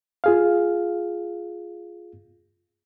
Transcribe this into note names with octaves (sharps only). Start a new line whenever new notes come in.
F4 G#4 F5